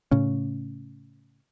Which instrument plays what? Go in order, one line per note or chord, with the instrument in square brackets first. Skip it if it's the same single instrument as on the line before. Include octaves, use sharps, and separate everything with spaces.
[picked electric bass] A2 C#3 C#4